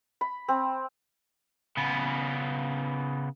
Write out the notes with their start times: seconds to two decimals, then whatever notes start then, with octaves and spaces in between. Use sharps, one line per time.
0.21 B5
0.48 C4
1.77 C#3 B3